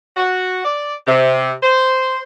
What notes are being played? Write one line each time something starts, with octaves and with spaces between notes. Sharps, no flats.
F#4
D5
C3
C5